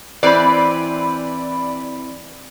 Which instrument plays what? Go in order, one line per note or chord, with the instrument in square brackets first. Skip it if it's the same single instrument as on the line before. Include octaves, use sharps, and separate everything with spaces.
[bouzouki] E3 C4 B4 [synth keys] D5 B5